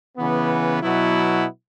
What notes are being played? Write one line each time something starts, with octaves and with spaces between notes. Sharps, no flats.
C#3 E3 B3
B2 F#3 B3 E4